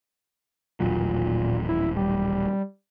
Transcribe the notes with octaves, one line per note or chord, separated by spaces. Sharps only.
D#1 A1 A#2 F#3
E4
G3